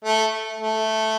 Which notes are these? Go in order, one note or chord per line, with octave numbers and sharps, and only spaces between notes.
A3
A3